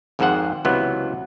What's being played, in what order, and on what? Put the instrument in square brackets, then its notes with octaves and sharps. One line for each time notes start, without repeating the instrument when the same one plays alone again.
[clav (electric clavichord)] G#1 F2 G#2 F3 C5 F#5
C#2 C3 E3 F#3 B3